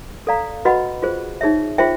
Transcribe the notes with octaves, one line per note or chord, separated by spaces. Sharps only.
A4 D5 F5 A#5
F#4 B4 D#5 F#5 B5
F4 G#4 C5
D#4 G#4 C#5 E5
F4 G#4 C5 E5 G5